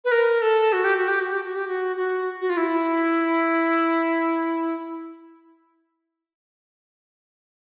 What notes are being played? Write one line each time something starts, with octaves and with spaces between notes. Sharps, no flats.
B4
A#4
A4
F#4
G4
F#4
G4
F#4
G4
F#4
G4
F#4
F#4
F#4
F4
E4